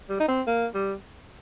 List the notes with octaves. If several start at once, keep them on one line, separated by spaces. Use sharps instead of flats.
G3
D#4
C4
A#3
G3